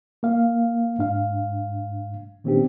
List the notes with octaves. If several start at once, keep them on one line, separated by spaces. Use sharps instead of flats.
A#3 F5
G#2 D4 F5
A#2 D#3 B3 C4 D4 G4